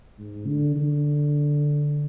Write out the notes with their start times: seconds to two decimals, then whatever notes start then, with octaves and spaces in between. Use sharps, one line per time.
0.18 G#2
0.47 D3
0.76 D3